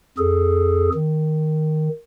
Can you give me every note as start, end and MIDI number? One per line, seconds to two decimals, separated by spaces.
0.18 0.89 41
0.18 0.89 68
0.18 0.89 69
0.94 1.89 51